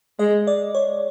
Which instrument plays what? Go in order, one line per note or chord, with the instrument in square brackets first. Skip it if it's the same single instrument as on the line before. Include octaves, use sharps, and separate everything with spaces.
[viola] G#3 [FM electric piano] D#5
[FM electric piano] D5
C#5